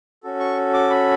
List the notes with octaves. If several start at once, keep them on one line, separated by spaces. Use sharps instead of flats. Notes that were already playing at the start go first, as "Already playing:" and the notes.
C#4 F#4 A4
C#6
D6
B5